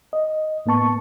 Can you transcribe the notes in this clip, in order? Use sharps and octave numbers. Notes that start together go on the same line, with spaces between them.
D#5
A2 A#3 B3 A5 C#6